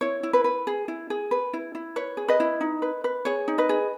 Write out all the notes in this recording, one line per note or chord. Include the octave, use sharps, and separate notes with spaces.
E4 C#5
E4
B4
B4
G#4
E4
G#4
B4
E4
E4
B4 C#5
G#4
B4 D#5
E4
D#4
B4
B4
G#4 C#5
D#4
B4 D#5
G#4